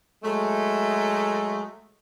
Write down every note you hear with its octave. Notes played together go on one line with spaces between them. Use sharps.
F#3 G#3 A3